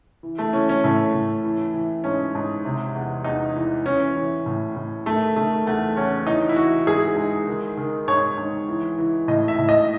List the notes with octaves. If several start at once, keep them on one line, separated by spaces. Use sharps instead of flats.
E3
A3
E3 C#4
C#4
A2 A3
A2
E3
E3
G#2 C#4
G#2
C3
E2
E2 D#4
E3
E3 C#4
E3
A2
A2
D#3 A3
D#3 A3
E2 A3
E2 C#4
E3 D#4
E4
E3 F#4
G#2 G#4
G#2
D#3
D#3
G#2 C#5
G#2
E3
E3
A2 D#5
E5
A2
D#5